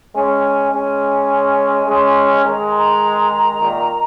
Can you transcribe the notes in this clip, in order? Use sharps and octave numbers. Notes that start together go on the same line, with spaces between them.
G#3 C#4 G#5
G#5
G#3 C#4 G#5
G#3 C#4
D#3 G#3 A#5
A#5
A#2 D#3